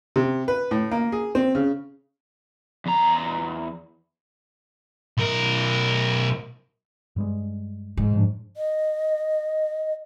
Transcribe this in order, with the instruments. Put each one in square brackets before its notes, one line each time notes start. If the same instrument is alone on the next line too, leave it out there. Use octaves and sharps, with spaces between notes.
[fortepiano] C3
B4
A2
A#3
G#4
C4
C#3
[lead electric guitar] E2 A#5
[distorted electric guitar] B1 A#4
[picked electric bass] G2 G3 G#3
[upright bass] G#2
[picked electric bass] A2 F3 D4
[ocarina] D#5